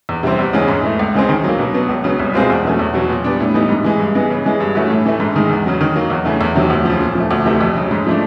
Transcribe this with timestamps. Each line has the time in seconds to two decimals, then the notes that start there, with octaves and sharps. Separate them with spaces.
0.09 E2
0.23 C3 E3 G3 C4
0.39 E2
0.53 C#3 E3 G#3 C#4
0.68 G#2
0.83 E3 A3
0.99 C#2
1.14 C#3 E3 G#3 C4
1.29 D#3
1.44 F#3 A#3
1.59 B2
1.74 F#3 B3
1.89 C#2
2.04 C#3 F#3 B3
2.20 C2
2.34 B2 G#3 C4 F4
2.50 E2
2.65 B2 F#3 A3 C#4
2.79 E2
2.94 B2 F#3
3.09 A#2
3.24 G3 B3 D4
3.40 A2
3.54 E3 G3 B3 D#4
3.69 G#2
3.84 E3 G#3
4.00 G2
4.15 E3 G#3 B3
4.30 C#3
4.46 E3 G#3
4.60 G2
4.75 E3 A3 C#4 F#4
4.90 A2
5.06 E3 A3
5.20 G#2
5.36 D#3 G#3
5.50 E2
5.66 C#3 F#3
5.81 D#3
5.96 F#3 A#3
6.10 E2
6.25 C#3 E3 A3
6.41 E2
6.55 C3 D#3 F#3
6.70 D2
6.85 C#3 F3
7.01 A#2
7.15 F3 A3
7.31 D2
7.46 C3 E3 A3
7.61 F2
7.76 C#3 F#3
7.91 G#2
8.07 F3 A3 D4